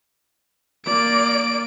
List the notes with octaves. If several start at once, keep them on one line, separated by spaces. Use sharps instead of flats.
A#3 D5 D7